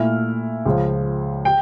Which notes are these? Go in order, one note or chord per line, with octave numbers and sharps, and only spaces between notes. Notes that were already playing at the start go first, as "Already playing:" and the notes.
Already playing: A#2 A3 E4 F6
C#2 C#3 F3
G5